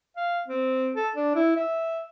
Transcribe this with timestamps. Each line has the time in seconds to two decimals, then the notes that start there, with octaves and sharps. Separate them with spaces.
0.16 F5
0.48 C4
0.95 A4
1.16 D4
1.35 E4
1.56 E5